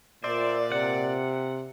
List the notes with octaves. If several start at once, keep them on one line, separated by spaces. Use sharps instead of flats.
A#2 C5 D5 E5
C3 F#5